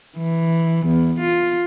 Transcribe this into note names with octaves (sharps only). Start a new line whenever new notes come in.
E3
E2
F4